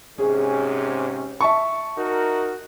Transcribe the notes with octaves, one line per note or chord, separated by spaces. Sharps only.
G#2 C3 C#4 G#4
E5 A5 C#6
D#4 F#4 A#4